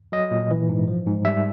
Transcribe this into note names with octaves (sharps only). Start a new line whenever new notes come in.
F#3 D#5
A#2
E3
G#2
F3
G#2
G3 E5